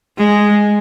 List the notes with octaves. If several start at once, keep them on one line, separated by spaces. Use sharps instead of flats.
G#3